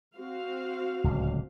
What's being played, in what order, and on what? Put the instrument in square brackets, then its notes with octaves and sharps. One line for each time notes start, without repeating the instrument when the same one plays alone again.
[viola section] C4 F#4 F5
[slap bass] D1 C#2 A#2